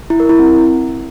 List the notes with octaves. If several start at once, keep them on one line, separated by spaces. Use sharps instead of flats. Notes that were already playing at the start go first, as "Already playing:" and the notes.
E4
A#4
E4
C4